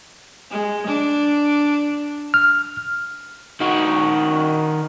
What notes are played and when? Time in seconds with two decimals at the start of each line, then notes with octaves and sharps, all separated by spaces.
0.50 G#3
0.87 D4
2.34 F6
3.61 D#3 F#4